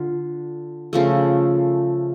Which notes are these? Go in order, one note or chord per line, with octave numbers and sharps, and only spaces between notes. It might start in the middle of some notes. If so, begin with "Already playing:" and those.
Already playing: D3 F4
C#3 F3 A3